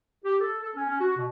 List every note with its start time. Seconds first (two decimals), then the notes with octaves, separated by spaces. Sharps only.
0.25 G4
0.41 A4
0.62 A4
0.76 C#4
0.89 C#4
1.00 F#4
1.17 B2